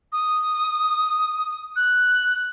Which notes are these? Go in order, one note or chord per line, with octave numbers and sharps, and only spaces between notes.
D#6
F#6